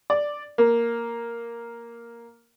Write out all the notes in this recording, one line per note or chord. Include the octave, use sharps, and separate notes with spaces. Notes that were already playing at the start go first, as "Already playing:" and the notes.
D5
A#3